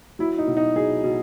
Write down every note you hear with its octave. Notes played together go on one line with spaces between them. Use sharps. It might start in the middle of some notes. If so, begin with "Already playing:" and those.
F#3 E4
D#4
B2
D#4
F#3 G#4
B2